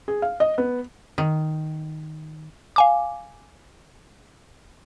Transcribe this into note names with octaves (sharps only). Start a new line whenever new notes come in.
G#4
F5
D#5
B3
D#3
F5 G#5 D6